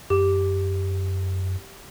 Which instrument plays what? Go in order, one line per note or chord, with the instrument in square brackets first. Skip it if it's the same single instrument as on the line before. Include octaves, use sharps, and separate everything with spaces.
[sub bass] F#2 [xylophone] G4